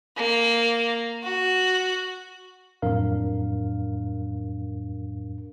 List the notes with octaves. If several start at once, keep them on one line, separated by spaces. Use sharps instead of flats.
A#3
F#4
F2 A2 F#3 D4 A#4 F5